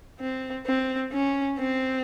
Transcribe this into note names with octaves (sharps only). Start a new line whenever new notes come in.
C4
C4
C#4
C4